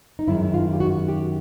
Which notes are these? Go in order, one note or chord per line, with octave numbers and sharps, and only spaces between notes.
D#4
F#2 D#3 G#3 E4
F4
G4
F#4
G4